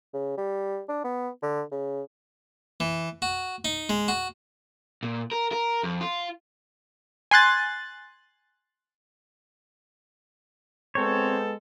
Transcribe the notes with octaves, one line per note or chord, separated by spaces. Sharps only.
C#3
G3
D4
B3
D3
C#3
E3
F#4
D#4
G#3
F#4
A#2
A#4
A#4
F2
F4
G#5 C6 F#6 A6
G#3 B3 C4 A4 C#5